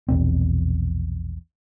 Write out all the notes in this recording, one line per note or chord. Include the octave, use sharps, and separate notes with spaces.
A#1 E2 B2 C4